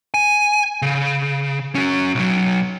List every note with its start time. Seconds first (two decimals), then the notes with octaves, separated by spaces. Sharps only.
0.14 G#5
0.82 C#3
1.75 C#4 F#4
2.15 B1 F#3